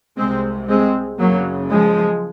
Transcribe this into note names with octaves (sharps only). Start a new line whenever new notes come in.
C2 C3 G#3 C4
G#3 C4
F#1 F#2 C#3 F#3 A#3
F3 G#3